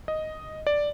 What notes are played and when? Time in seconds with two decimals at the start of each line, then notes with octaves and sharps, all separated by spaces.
0.08 D#5
0.67 D5